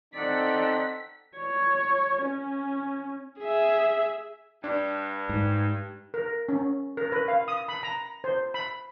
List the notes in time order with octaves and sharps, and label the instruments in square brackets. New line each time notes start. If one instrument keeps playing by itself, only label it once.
[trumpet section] C4 A4 [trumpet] D#4 [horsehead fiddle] D5 F#5 [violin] B6
[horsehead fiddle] C#5
C#4
[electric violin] G#4 E5
[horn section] G2 [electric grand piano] D4
[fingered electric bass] G#2
[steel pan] A#4
C#4
A#4
B4
F5
D#6
B5
A#5
C5
B5